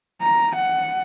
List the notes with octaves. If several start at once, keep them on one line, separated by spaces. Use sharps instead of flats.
A#5
F#5